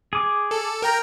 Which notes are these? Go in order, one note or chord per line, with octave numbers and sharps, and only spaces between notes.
G#4 D6
A4
A#4 G5 A#5